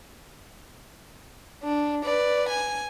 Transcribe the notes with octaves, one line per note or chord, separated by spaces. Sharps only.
D4
B4 D5
G#5